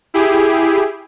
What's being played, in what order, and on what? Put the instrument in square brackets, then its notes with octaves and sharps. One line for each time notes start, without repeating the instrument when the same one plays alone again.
[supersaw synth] E4 G4 G#4